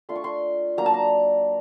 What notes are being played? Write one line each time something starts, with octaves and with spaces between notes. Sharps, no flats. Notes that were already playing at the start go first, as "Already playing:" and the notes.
A3 D4 F4 C6
C#6
C6
F#3 A#3 D4 A#5
A5
A#5